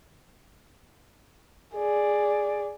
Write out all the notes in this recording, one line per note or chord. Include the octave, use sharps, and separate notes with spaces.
G#4 D5